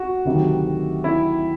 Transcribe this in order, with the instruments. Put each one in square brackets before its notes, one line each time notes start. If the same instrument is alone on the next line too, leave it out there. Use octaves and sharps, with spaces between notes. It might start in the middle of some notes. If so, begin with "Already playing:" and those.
Already playing: [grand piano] F#4
[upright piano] D2 C3 D#3 F#3
[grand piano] E4